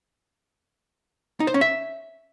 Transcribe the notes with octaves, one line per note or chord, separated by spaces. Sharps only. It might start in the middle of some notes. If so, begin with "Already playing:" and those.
D#4
C5
C#4
E5